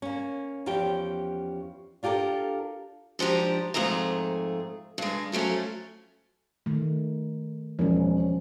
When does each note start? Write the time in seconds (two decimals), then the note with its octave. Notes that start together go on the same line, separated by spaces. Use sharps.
0.02 A#3 C#4
0.66 E2 F3 C#4 G4 G5
2.03 D4 F4 G4 A4 A#4
3.19 G#2 F3 D4 G4 A#5
3.74 F2 G#2 A3 G#4 A#5
4.98 G2 G#3
5.32 F3 F#3 A3 C#4
6.66 D#3 A3
7.79 E1 F3 C#4